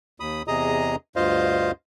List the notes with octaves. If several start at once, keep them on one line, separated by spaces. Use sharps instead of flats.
D#2 B5 D#6
E2 C3 G#4 D#5 A#5 D#6
D2 G2 F4 C5 D#5 F5